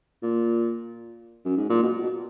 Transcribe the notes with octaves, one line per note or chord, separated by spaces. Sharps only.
A#2
F#2
G#2
A#2
B2
B2